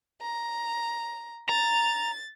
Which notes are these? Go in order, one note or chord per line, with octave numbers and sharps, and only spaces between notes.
A#5
A#5 A6